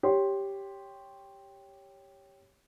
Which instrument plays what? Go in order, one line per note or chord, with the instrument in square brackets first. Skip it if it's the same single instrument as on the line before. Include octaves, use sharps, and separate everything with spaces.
[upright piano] G4 C#5 C6